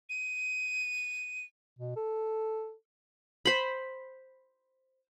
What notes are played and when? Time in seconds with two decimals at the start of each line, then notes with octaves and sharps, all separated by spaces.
0.10 D#7
1.79 B2
1.97 A4
3.45 C5 B5